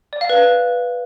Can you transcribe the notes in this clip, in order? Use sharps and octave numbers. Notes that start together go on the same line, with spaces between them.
D5
F5
B4